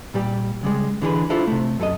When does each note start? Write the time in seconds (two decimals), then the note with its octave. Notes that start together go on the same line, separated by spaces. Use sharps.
0.14 A#2 G3 G4
0.63 C#3 G3 G#3
1.02 D3 E3 G#4 A#4 B4
1.30 D4 E4 F4 A4 C5
1.47 C3 A3
1.80 F#2 A4 A#4 D#5